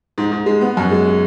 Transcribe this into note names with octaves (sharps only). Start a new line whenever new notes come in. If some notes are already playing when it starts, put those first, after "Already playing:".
G#2
G#2
G#3
B3
F#2
G#3